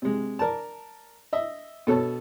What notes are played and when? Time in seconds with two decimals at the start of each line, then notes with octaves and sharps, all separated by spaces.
0.02 C3 G#3
0.39 A#4 D5 A5
1.33 D#5 E5
1.87 B2 A4 C#5 A5